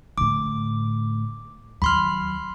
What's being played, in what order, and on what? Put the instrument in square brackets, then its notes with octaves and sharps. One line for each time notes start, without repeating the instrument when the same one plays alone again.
[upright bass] A2 D3 [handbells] D6
[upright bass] D#2 F#3 [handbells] B5 C6 F6